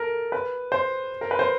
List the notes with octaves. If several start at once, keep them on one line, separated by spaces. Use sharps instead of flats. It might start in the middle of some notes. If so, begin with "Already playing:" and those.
Already playing: A4 A#4
B4
C5
A#4
B4
C5